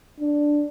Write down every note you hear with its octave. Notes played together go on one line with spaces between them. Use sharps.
D4